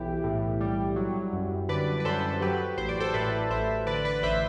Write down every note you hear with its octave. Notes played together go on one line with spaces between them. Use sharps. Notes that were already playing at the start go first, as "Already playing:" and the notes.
Already playing: B1 E3 E4 G4
A2
G3
F#3
F#2
D3 B4 D5
B4
F#2 A4 C5
F#3 G4 B4
A1 C5
D5
A4 C5
A2 B4 D5
A1 C5 E5
D3 B4 D5
B4 D5
A1 C5 E5